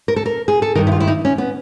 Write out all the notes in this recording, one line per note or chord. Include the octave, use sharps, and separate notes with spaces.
A#4
A4
A#4
G#4
A4
G2 D#3 A#4
E4
F4
E4
D#4
C#4
B3